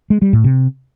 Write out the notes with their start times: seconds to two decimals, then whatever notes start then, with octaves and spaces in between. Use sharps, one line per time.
0.10 G#3
0.22 G3
0.33 A2
0.44 C3